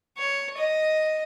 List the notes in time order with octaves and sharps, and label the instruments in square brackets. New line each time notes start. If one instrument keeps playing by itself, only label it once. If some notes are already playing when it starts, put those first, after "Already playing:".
[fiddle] C#5
D#5